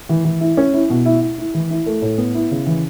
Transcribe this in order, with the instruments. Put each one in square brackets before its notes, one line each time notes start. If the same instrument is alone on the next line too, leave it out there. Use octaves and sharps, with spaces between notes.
[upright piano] E3
E3
E4
C#4
E4
B2
E4
E4
E4
E3
E4
A3
A2
B3
E4
C#3
E3